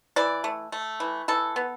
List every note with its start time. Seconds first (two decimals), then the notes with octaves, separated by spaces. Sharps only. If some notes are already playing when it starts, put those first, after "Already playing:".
0.16 E3 D5
0.44 A3
0.72 A3
1.00 E3
1.28 E3 A4
1.56 B3